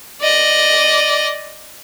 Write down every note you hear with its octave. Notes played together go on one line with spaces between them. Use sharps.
D5 D#5